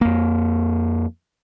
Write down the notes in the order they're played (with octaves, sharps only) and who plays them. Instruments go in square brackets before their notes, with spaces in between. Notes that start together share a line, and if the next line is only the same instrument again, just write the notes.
[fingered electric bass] F2 A#3